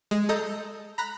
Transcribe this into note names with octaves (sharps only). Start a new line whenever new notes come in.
G#3
A4 D#5 A#5 D#6 G6
A#5 B5 F#6 A#6